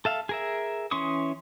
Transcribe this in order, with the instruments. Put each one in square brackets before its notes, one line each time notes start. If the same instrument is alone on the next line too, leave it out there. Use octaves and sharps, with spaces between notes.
[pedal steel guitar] A4 E5 F5
G#4 A#4 E5
E3 C#4 C6 C#6 D#6